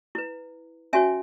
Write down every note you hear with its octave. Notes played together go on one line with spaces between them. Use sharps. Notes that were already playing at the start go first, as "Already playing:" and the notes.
E4 B4
C#4 F#4 C#5 E5 G#5